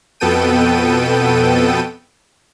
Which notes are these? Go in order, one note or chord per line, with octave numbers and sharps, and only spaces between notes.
F2 B2 B3 A4 G5 D#7